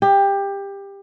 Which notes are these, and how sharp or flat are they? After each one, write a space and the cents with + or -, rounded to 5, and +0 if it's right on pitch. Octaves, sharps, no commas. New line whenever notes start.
G4 +20